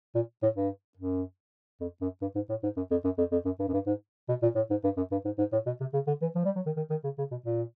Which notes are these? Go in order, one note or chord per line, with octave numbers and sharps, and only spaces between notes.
A#2
A2
G2
F#2
F2
F#2
G2
G#2
A2
G#2
F#2
F2
F#2
F2
F2
F#2
G2
F#2
G2
G#2
B2
A#2
A2
G#2
G2
F#2
G2
G#2
G#2
A2
B2
C3
C#3
D3
E3
F3
G3
F#3
D#3
D#3
D#3
C#3
C#3
B2
A#2